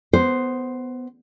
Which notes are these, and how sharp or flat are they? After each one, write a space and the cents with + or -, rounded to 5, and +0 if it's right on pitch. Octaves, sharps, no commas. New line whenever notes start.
B3 +15 C5 +0